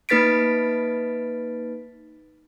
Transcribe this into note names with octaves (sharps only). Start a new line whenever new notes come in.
A#3 D#4 B4 A6 B6 D7